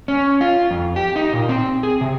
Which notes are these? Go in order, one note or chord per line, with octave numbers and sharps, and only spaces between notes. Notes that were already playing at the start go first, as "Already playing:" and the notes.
C#4
F4
F2
G4
D#4
A#2
C4
G#4
C3